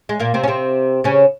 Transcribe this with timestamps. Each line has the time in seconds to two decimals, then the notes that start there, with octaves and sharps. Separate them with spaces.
0.09 G#3
0.20 A#2 A#3
0.34 C3 C4
0.43 C#4
0.48 C3 C4
1.04 C#3 C#4